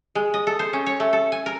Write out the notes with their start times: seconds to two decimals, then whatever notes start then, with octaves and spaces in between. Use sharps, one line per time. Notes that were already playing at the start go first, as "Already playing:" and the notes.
0.15 G#3
0.34 D#5
0.47 A4
0.59 C5
0.73 C#4
0.86 C#5
1.00 A3
1.13 A4
1.32 G#5
1.46 A#4